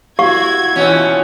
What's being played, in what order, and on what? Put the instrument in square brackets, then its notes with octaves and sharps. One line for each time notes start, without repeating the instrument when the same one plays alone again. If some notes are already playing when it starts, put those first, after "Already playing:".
[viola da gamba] E4 F#4 [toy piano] G4 F5 C#6 [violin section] G#6
[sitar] B2 C#4 [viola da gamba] E3 F4